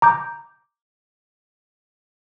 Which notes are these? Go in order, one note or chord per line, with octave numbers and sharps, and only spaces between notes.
A#5 D6 G6